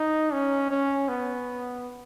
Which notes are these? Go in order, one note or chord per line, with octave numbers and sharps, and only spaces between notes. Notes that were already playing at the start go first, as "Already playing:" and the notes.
Already playing: D#4
C#4
C#4
B3